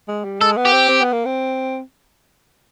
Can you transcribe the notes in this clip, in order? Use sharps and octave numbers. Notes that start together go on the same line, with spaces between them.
G#3
G3
G#3 A4
B3
G4
C4
C4
B3
A#3
C4